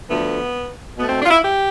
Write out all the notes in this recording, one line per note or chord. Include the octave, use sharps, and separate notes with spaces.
D2 D3 F3 A3 B3
B2 A3 B3
C4
D4
F4
E4
G4